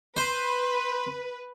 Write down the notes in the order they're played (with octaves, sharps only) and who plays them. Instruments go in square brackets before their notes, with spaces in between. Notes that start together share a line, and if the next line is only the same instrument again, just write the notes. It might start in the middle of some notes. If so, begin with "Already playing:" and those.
[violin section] B4 [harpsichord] C5 [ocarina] C6